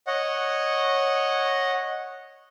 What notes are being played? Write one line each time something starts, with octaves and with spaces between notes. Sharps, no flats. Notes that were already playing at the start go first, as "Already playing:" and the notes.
C#5 D#5 F#5